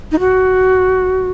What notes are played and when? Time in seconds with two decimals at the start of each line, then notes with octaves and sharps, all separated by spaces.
0.12 D#4
0.19 F#4